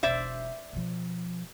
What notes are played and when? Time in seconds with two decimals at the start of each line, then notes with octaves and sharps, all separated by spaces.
0.03 E1 B1 C5 D5 E5
0.73 B2 F3